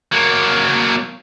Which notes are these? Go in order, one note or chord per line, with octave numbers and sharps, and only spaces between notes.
F#3 A#3